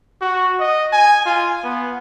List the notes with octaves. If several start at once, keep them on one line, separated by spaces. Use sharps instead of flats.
F#4
D#5
G#5
F4
B3